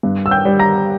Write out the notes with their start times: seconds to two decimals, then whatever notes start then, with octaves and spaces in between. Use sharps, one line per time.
0.03 G2
0.26 E6
0.31 G5 G6
0.45 G3
0.59 A#5 A#6